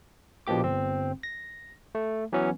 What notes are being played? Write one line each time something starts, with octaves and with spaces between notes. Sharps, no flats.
A#1 B2 F3 A#3 G4 D6
G1 C4
A#6
A3
E3 F#3 B3 C#4